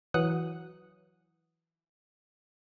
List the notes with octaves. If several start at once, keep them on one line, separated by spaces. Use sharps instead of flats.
E3 F#3 F#5 D#6 F#6